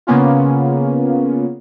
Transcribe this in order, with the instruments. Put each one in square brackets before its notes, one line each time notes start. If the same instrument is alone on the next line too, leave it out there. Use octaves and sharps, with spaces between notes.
[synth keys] C#3 A#3 B3 C#4 F4